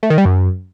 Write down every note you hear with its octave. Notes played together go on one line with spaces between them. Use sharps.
A3
D#3
G3
F#2